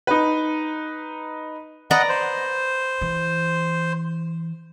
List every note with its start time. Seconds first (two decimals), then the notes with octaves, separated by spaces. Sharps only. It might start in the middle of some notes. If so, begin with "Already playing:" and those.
0.07 D#4 B4
1.91 B4 D5 D#5 F#5 A#5
2.09 C5
3.01 E3